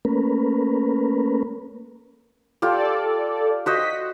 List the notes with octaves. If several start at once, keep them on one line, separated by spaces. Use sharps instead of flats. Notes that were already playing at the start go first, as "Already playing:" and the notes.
A3 A#3 C#4 A#4 B4
F4 G4 A4 D5
F#4 C5 D#5 B6